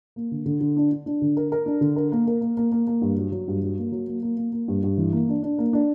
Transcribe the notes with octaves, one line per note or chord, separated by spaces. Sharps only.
A#3
D3
D3
D3
D4
D4
D4
D3
A#4
A#4
D4
D3
A#4
A#3
A#4
A#3
A#3
A#3
A#3
G2
F#3
F#3
G2
F#3
A#3
F#3
A#3
A#3
A#3
A#3
G2
G2
E3
A#3
D4
D4
A#3
D4